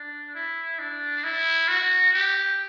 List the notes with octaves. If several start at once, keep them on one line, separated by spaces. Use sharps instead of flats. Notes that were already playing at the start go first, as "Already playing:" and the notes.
Already playing: D4
E4
D4
E4
F#4
G4